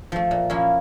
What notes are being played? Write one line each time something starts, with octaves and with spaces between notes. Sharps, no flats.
F3 A3
A#2
F3 A#3 C#4 E4